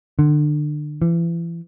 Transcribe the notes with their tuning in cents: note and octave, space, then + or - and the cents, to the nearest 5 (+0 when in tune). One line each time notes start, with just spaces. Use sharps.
D3 +30
E3 +35